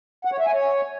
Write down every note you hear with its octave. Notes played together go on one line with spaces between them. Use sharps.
F#5
C#5
E5
G#5
C#5